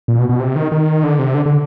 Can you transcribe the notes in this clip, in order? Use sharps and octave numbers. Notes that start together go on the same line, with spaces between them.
A#2
B2
B2
C3
D#3
D#3
D3
C3
D3
D3